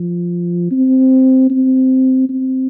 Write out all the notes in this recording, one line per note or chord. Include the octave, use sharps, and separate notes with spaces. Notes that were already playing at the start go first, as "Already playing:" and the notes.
Already playing: F3
C4
C4
C4